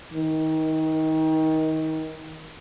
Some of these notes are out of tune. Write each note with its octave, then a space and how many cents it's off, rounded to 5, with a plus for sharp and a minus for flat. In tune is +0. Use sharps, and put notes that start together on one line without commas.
D#3 +25